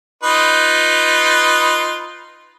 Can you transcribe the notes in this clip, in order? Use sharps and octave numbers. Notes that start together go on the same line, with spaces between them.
D#4 F4 B4